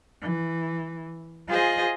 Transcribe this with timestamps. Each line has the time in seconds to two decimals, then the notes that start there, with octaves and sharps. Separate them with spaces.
0.21 E3
1.49 F4 G#4 C5 D#5 G#5